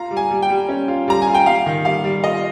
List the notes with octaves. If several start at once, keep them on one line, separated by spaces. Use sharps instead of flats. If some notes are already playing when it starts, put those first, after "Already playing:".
Already playing: F4 A#5
G3
G#5
G3
G5
G3
C#4
F4
G3 A#5
G#5
F4
G5
G3 F5
D#3
G3 F5
G3
F4 D#5